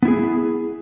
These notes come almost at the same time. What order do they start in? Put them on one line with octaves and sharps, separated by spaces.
B3 E4 G#4